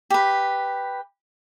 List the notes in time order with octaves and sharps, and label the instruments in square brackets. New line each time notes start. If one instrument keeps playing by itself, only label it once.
[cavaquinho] G4 B4